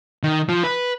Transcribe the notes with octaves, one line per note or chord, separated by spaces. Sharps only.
D#3
F3
B4